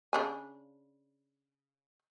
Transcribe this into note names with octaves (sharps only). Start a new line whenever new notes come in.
C#3 D4 G#5